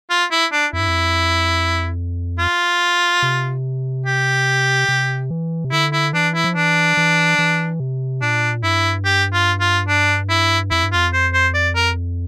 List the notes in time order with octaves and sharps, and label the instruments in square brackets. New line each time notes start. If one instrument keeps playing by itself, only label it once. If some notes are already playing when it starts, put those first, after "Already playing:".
[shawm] F4
E4
D4
[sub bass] F2 [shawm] E4
[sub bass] G2
F2
[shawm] F4
[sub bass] C3
[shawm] G4
[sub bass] C3
E3
C3
[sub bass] D3 [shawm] E4
[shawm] E4
[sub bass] E3 [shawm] D4
[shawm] E4
[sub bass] F3
[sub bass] E3 [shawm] D4
[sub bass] E3
E3
C3
[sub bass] A#2 [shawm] D4
[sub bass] G2 [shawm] E4
[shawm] G4
F4
F4
D4
E4
[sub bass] F2 [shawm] E4
[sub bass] G2
[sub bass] F2 [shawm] F4
[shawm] C5
C5
D5
A#4